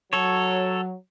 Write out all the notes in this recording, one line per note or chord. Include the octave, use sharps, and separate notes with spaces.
F#3 A4 C#5